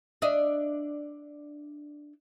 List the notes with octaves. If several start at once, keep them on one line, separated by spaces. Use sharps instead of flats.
D4 D#5 E5